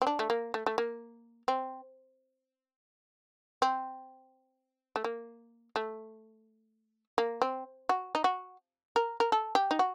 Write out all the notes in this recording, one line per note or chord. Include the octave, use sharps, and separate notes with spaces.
C4
D4
A3
A#3
A3
A3
A#3
C4
C4
A3
A#3
A3
A#3
C4
F#4
D#4
F#4
A#4
A#4
A4
G4
D#4
F#4